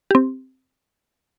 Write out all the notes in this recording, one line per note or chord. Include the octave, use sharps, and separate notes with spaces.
C4 G4